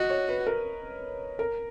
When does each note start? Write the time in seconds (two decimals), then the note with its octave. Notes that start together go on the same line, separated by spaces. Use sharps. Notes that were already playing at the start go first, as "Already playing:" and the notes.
Already playing: F#4 D#5
0.10 C#5
0.29 B4
0.47 A#4
1.39 A#4